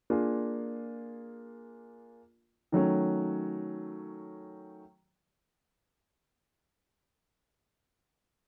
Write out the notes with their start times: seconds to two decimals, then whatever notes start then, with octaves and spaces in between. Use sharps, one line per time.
0.10 A#3 D4 F4 G#4
2.72 D#3 F#3 A3 C#4